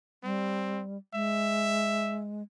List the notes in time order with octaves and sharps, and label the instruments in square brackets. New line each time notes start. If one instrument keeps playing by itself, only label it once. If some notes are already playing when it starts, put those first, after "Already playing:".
[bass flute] G3 [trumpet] C4
[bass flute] G#3 [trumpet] E5